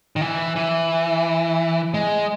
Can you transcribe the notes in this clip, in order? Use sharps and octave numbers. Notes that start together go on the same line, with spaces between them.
D#3
E3
E3
G#3